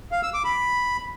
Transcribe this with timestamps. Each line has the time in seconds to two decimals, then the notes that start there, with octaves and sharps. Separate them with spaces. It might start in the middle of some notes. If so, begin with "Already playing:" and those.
0.12 F5
0.23 E6
0.34 D6
0.45 B5